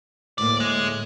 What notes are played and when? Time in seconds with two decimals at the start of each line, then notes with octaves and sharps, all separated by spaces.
0.38 D2 A2 A#3 D5
0.60 G#3